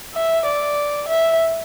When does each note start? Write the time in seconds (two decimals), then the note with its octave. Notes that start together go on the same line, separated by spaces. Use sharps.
0.14 E5
0.46 D5
1.09 E5